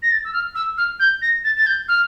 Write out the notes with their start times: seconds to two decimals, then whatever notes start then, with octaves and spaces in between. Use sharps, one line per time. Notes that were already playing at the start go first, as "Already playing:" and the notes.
0.02 A#6
0.10 A6
0.24 E6
0.33 F6
0.55 E6
0.77 F6
0.99 G6
1.21 A#6
1.44 A6
1.56 A6
1.66 G6
1.88 F6